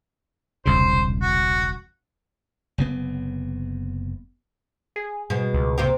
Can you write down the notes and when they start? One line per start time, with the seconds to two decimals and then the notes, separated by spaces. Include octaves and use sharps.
0.65 E1 C2 C#3 C5
1.22 F#4
2.78 F#1 C3 B3
4.96 G#4
5.30 B2 G#3
5.54 C#2
5.78 C3 A#3 G4